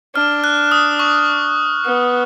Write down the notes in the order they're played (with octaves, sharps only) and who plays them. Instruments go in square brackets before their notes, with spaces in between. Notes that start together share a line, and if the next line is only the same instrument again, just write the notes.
[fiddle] D4 [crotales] F6
[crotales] F#6
D#6
C#6
[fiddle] B3